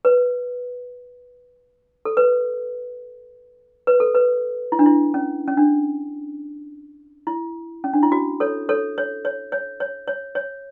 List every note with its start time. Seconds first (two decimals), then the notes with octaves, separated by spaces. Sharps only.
0.05 B4
2.05 A4
2.17 B4
3.87 B4
4.00 A4
4.15 B4
4.72 E4
4.79 D4
4.86 E4
5.14 C#4
5.48 C#4
5.57 D4
7.27 E4
7.84 C#4
7.93 D4
8.03 E4
8.12 F#4
8.40 A4 C#5
8.69 A4 C#5
8.98 C#5
9.25 C#5
9.52 C#5
9.80 C#5
10.08 C#5
10.35 C#5